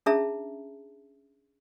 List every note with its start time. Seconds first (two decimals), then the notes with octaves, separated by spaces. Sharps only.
0.06 C#4 D4 G#4 E5 A5 A#5